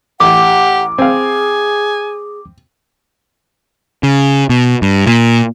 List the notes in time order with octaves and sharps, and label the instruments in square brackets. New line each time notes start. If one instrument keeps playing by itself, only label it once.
[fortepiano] A1 [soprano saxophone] G4 [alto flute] F#5 [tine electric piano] D6
[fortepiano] C4 F5 [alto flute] G#4 [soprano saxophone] G#5
[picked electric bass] C#3
B2
G2
A#2